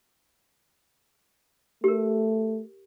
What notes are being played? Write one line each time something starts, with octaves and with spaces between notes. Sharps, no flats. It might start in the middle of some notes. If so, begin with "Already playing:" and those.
A3 G4 A#4